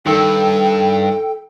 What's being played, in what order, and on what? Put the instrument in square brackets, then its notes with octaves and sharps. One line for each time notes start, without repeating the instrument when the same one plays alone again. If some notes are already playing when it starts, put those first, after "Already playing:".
[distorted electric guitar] G2 [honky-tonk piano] D#3 E6 [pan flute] A4 [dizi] G5